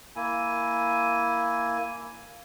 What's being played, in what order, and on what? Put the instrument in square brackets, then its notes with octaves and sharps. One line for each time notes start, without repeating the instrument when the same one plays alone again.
[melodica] A#3 E4 G#5